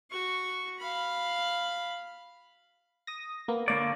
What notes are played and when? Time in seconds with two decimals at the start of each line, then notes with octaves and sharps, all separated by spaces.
0.11 F#4 C#6
0.78 F5 B5
3.07 D#6 A#6
3.48 A#3 B3
3.68 D3 A#3 C#5 D5